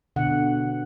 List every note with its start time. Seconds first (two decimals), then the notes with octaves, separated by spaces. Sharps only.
0.16 B2 D3 F#5